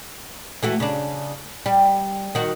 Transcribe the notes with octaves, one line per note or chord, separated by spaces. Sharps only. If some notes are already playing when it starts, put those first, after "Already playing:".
E3 A3 F#4
C#3 D4
G3
D#3 F#4